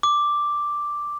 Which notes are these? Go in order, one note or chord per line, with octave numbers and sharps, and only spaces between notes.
D6